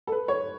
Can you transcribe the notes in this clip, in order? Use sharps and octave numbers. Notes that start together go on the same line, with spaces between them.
A4
B4
C#5